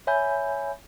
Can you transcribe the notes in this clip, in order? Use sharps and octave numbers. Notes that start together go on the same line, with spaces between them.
C#5 E5 G#5 B5 G6